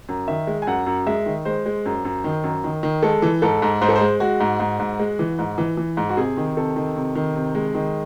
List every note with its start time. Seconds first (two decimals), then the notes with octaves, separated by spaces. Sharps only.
0.09 F#2
0.28 D#3 E5
0.47 G#3
0.62 G#5
0.67 F#2 F#5
0.87 F#2
1.06 G#3 E5
1.26 D#3
1.45 G#3 C5
1.66 G#3
1.86 F#2
2.05 F#2
2.24 D#3
2.44 F#2
2.64 D#3
2.83 D#3
3.03 G#3 A4
3.22 E3
3.42 G#2 A4
3.62 G#2
3.81 G#2 C5
3.89 A4
3.96 C5
4.01 G#3
4.20 G#3 F#4
4.40 G#2
4.60 G#2
4.79 G#2
4.99 G#3
5.19 E3
5.39 G#2
5.58 E3
5.77 E3
5.97 G#2
6.09 F#4
6.17 C3 G#4
6.37 D#3
6.57 C3 A4
6.76 D#3
6.96 C3
7.15 D#3
7.35 C3
7.55 G#3
7.74 D#3